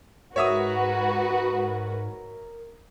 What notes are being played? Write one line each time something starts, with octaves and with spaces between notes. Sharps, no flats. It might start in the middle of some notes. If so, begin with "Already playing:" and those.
G#2 F#4 A#4 B4 C#5 E5 D#6